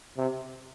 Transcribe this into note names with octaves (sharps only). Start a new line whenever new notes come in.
C3